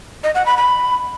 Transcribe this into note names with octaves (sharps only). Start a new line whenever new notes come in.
D#5
F#5
B5
B5